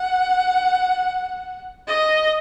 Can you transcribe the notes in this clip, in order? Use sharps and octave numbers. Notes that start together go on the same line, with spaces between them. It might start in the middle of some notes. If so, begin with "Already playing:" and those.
Already playing: F#5
D#5